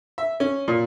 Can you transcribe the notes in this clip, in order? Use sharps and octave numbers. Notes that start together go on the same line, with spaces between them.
E5
C#4
A#2